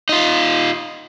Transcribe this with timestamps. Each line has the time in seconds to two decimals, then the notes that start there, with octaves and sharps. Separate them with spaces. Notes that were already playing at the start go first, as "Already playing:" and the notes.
0.09 D#4 F4